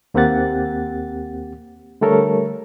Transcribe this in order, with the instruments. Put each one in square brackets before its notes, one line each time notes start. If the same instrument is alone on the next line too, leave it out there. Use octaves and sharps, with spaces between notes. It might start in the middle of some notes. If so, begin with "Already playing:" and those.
[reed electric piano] D#2 A#3 C4 G4 F#5 A6
D3 G3 A3 A4 A#4 C#5